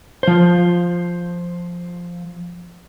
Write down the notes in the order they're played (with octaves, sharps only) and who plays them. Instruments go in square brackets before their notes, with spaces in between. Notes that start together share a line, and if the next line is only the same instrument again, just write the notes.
[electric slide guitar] F3 C5